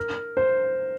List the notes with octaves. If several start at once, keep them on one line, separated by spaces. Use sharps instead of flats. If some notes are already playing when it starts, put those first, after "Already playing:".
Already playing: A#4
C5